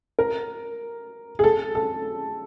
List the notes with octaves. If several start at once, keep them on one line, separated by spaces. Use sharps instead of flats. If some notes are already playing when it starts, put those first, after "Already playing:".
A#4
G#4
A4
A4